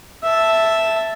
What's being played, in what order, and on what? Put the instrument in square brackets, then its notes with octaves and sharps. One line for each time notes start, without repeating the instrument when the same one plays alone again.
[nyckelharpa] E5 A5